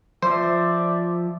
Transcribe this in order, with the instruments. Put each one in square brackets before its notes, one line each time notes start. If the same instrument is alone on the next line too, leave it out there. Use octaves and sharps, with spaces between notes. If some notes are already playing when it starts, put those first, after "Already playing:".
[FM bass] F3 [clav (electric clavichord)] C5 [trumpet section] D5 E5